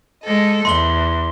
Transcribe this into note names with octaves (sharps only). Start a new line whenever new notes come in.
G#3 A4 D#5
E2 C6 G7